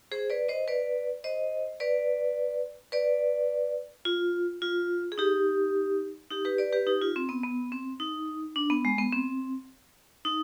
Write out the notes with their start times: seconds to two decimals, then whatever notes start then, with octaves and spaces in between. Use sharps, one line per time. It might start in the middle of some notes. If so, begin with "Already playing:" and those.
0.12 G#4 C5
0.30 B4 D5
0.48 C5 D#5
0.68 B4 D5
1.24 C5 D#5
1.80 B4 D5
2.92 B4 D5
4.05 F4
4.62 F4
5.12 G#4
5.18 D#4 G4
6.31 D#4 G4
6.45 G4 B4
6.58 B4 D5
6.73 G4 B4
6.87 D#4 G4
7.01 F4
7.16 C4
7.29 B3
7.43 B3
7.72 C4
8.00 D#4
8.56 D4
8.70 B3
8.85 G#3
8.98 B3
9.13 C4
10.25 D#4